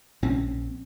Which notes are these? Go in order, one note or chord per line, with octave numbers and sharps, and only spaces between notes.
A#1 C4 C#4